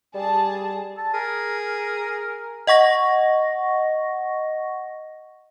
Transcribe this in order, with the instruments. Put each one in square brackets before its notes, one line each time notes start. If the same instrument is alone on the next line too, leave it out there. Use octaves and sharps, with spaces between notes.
[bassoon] G3 [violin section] G#4 A5
[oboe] A5
[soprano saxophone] G#4 [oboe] A#4
[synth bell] D#5 F#5 C#6 A#6